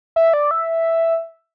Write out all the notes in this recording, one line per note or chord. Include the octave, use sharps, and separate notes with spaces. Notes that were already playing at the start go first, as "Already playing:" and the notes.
E5
D5
E5